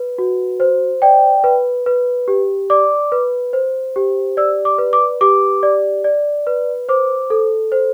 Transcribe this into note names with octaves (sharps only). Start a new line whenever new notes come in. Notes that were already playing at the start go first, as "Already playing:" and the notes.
Already playing: B4
F#4
C5
D5 G5
B4
B4
G4
D5 D6
B4
C5
G4
D5 E6
D6
B4
D6
G4 D6
D5
D5
B4
C5 D6
A4
C5